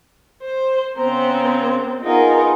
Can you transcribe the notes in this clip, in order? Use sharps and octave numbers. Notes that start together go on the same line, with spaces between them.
C5
C#3 B3 C4 C5 A#5
B3 D#4 F4 G#4 A#4